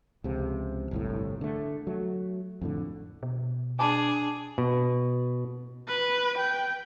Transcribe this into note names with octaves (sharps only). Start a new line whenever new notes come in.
C#2 C3 F3
G1 C2 A2
D3 A3
F#3 A3
F2 A2 D3
B2
D4 G#4 G#5 A5 B5 D6
B2
B4
G5